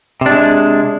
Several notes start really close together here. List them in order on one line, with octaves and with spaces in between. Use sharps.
C3 D4 G#3